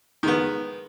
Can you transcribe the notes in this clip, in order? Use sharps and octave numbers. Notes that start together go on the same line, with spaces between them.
D#3 G#3 B3